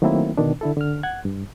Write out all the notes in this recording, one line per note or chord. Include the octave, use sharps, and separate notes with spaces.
D#3 F#3 A3 A#3 C4 E4
B2 D3 D#3 D4
D3 E4 A4
D3 F6
F#5 F#6 G#6
G2